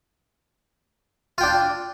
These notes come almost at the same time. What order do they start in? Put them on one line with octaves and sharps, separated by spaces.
F4 G5 D4